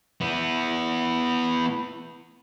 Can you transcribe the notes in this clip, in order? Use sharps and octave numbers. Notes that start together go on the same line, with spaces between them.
B3 E4